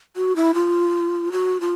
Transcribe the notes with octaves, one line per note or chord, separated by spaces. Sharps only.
F#4
E4
F4
F#4
F4